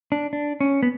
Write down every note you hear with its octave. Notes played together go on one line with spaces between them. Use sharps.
D4
D4
C#4
B3